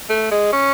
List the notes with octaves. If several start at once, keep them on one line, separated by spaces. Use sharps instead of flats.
A3
G#3
C#4